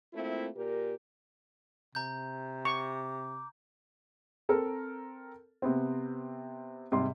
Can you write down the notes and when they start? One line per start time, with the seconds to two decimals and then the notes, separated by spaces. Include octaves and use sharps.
0.13 A3 A#3 C4 E4 F4
0.55 A#2 G4 A#4
1.95 C3 A#5 G6
2.65 C#6 D6
4.49 C4 A4 A#4
5.62 C3 B3 C4
6.92 G#2 C3 G3 C6